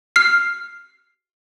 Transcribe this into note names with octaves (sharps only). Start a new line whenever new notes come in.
F6 C7